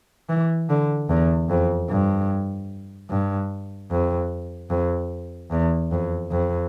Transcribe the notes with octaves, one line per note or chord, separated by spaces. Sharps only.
E3
D3
E2
F2
G2
G2
F2
F2
E2
F2
F2